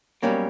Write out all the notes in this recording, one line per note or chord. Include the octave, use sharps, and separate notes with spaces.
B1 B2 G3 A#3 C#4